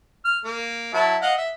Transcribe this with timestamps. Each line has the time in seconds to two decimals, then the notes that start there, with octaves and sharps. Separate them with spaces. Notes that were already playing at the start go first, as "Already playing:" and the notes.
0.25 F6
0.45 A#3
0.94 F#3 E4 A5
1.22 D#5 F5 F#5
1.38 E5